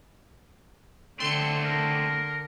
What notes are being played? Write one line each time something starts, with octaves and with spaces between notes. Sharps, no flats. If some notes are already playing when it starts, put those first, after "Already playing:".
D3 A3 C4 C6 C#7
A#4